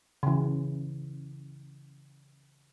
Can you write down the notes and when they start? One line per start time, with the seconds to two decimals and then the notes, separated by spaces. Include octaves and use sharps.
0.23 C#3 E3